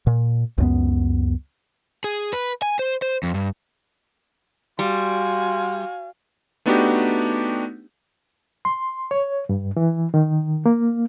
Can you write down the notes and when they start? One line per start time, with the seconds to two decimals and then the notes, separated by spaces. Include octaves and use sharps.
0.07 A#2
0.58 C#2 F#2 B3
2.04 G#4
2.33 B4
2.62 G#5
2.79 C5
3.02 C5
3.23 F2
3.34 G2
4.79 G3 F#4 F5 G#5 C6
6.66 A3 B3 D4 D#4 F#4 G4
8.65 C6
9.11 C#5
9.49 G2
9.77 E3
10.14 D#3
10.66 A#3